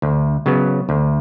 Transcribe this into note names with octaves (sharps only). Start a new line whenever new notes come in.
D2
C#3 F#3 B3
D2